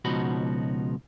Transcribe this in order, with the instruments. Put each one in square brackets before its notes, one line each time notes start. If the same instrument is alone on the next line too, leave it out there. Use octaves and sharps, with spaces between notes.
[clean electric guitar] C#2 B2 F3 D#4 F#4 B5